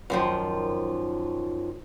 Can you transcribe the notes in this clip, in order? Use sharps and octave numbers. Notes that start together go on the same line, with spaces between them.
F#2 D#3 F3